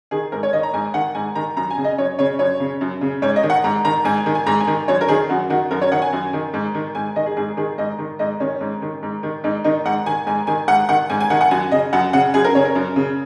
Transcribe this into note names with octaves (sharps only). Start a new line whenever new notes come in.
D#3 G#4
G#2 A#4
C#5
D#3 D#5
A#5
G#2 G#5
D#3 F#5
G#2 G#5
D#3 A#5
F#2 A#5
G#5
C#3
D#5
F#2 C#5
C#3 C#5
F#2 C#5
C#3
F#2
C#3
G#2 C#5
D#5
D#3
F#5
G#2 A#5
D#3 A#5
G#2 G#5
D#3
G#5
G#2 A#5
G#5
D#3
F#2 C#5
A#4
D#3 G#4
F#2 F#4
D#3 F#4
F#2 A#4
C#5
D#3 F#5
G#5
F#2
D#3
G#2
D#3
G#2 G#5
D#3 D#5
G#4
G#2 G#4
D#3 G#4
G#2 D#5
D#3
G#2 D#5
D#3 C#4
G#2
D#3
G#2
D#3
G#2 D#4
D#3 D#4
G#2 F#5
D#3 G#5
G#2 G#5
D#3 G#5
G#2 F#5
D#3 F#5
G#2 G#5
G#5
D#3 F#5
F#5
F#2 G#5
C#3 D#5
F#2 F#5
C#3 F#5
F#2 G#4
A#4
C#3 C#5
A#4
F#2
C#3